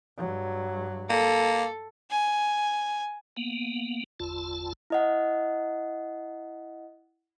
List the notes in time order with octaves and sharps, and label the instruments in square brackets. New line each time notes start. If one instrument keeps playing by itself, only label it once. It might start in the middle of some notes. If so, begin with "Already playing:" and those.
[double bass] G2 F#3
[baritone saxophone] A#3 [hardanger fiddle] A4
[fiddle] G#5
[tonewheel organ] A#3 B3
G1 E2 F4 A5
[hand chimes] E4 D#5 F#5